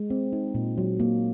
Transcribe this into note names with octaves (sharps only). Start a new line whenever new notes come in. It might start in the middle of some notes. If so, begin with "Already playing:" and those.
Already playing: G#3
C4
D#4
A#2
F#3
A#3